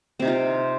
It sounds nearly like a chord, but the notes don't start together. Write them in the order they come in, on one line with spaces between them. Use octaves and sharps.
C4 C3 D#4 F4